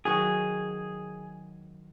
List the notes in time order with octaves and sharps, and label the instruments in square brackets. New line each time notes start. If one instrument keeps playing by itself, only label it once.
[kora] D#3 F#3 C#5 [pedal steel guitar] G#4